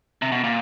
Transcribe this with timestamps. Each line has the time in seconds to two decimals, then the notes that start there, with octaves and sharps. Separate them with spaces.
0.22 C3
0.32 B2
0.44 A#2